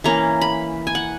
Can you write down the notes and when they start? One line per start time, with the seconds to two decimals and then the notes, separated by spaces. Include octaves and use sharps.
0.04 E3 A#3 C#4 A#5
0.41 B5
0.87 G#5
0.95 F#5